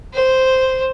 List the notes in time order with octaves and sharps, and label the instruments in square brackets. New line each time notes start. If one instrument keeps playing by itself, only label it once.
[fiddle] C5